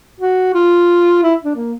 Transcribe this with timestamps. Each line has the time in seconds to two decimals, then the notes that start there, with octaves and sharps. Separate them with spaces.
0.21 F#4
0.54 F4
1.23 E4
1.45 D4
1.55 A#3